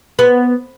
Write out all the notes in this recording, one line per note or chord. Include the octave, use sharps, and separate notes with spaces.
B3